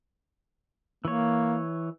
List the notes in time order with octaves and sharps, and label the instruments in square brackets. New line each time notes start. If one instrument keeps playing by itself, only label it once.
[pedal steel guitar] E3 C#5 [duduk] A#3